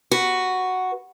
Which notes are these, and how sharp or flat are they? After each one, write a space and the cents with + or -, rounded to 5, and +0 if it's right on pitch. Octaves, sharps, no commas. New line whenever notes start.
F#4 +0 B4 +0